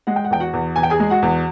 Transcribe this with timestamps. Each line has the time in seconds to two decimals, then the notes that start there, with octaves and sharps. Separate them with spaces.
0.07 G#3 F#5
0.16 G5
0.25 F#5
0.31 E2 G5
0.40 F#4 F#5
0.53 E2
0.76 E2 G#5
0.83 G5
0.90 G#4 G#5
1.00 G#3
1.10 F#4 F#5
1.22 E2